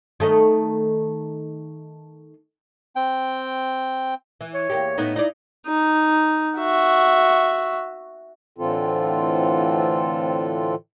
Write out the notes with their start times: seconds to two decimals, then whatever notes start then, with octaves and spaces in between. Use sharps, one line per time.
0.20 D#3 A3 D#5
2.96 C4 G5
4.41 E3
4.54 C#5
4.70 E2 A#3 G4
4.98 A2 B3 D#4
5.16 D#4 E4 D5
5.67 D#4
6.58 F#4 E5
8.58 A2 D3 E3 C4 F4 A4